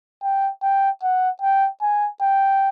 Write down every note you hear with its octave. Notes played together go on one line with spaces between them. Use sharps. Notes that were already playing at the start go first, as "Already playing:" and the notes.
G5
G5
F#5
G5
G#5
G5